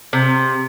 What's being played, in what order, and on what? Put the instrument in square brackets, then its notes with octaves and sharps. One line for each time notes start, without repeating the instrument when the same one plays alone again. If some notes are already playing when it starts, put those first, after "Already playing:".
[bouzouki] C3